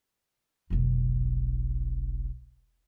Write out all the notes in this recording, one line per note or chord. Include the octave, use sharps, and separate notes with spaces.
F1 B1